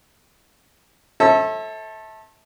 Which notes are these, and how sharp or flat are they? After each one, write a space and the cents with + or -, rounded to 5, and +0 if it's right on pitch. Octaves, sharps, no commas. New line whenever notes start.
A4 +0 C#5 -45 E5 -30